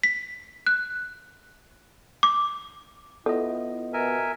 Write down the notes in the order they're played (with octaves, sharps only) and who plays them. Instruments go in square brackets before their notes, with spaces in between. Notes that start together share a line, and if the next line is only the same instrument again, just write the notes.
[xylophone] B6
F#6
D6
[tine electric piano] B3 F4 D#5 [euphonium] E4 [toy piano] A4
[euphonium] B2 [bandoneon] A#4 E5 G#5